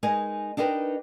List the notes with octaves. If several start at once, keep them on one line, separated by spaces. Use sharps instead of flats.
G#3 D#4 A#4 G#5
D4 D#4 G4 A#4 B4